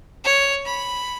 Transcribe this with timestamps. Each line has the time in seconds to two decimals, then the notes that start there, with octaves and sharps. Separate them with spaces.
0.24 C#5
0.66 B5